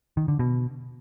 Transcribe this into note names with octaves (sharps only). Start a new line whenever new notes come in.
D#3
D3
B2